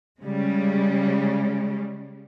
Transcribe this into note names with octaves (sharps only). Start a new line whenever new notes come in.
C#3 G3 G#3